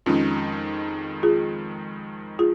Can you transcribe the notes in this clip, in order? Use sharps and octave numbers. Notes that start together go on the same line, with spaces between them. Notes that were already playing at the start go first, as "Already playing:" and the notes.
F2 D#3 G#3 C#4 D#4 F4
F4 G#4
F4 G#4